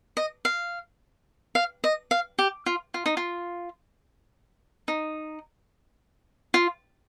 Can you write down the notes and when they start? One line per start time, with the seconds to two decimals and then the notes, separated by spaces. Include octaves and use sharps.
0.17 D#5
0.45 F5
1.55 F5
1.84 D#5
2.11 F5
2.39 G4
2.66 F4
2.94 F4
3.06 D#4
3.17 F4
4.88 D#4
6.54 F4